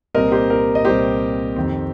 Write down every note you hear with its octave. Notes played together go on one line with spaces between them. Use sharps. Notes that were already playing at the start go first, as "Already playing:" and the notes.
C2 A#2 G3 C4 A#4 D#5
G4 C5
A#4
D#5
C2 A#2 G3 C4 G4 C5
F2 D#3 C4